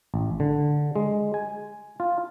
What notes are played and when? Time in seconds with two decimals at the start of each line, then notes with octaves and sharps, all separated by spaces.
0.14 A1
0.40 D3
0.96 G#3
1.34 G#5
2.00 F4